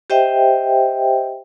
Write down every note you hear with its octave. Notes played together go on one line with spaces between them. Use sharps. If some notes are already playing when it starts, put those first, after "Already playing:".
G4 C5 D#5 E5 G5